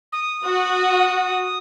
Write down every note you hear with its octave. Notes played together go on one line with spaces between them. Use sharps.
D#6
F#4